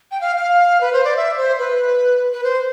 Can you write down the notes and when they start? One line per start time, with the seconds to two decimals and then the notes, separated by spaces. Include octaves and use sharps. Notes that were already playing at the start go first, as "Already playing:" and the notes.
0.11 G5
0.21 F5
0.37 F5
0.81 B4
0.93 C5
1.04 D5
1.16 E5
1.37 C5
1.59 B4
2.33 B4
2.44 C5